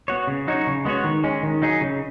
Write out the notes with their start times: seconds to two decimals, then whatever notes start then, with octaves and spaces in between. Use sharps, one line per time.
0.08 B3 F#4 C#5
0.27 C#3
0.48 F#3 D#4 F#4 C#5
0.67 C#3
0.85 G#3 B3 F#4 C#5
1.04 D#3
1.24 G#3 C#4
1.43 D#3
1.62 F#3 D#4 G#4
1.81 C#3